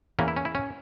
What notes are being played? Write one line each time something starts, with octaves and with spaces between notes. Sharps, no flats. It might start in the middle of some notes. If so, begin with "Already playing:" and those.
E2 E3 A#3 C#4
E4
C#4
E4
C#4